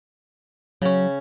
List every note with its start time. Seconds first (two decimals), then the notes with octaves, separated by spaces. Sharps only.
0.82 C#3 F#3 C#4